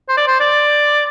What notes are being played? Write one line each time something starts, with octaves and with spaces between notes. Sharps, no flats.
C5
D5
C5
D5